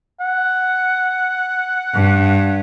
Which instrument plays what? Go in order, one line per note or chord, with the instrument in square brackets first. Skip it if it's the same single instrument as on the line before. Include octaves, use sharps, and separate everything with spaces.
[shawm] F#5
[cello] G2